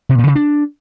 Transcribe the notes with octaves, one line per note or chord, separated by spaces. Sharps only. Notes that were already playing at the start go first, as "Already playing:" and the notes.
C3
A#2
C#3
D4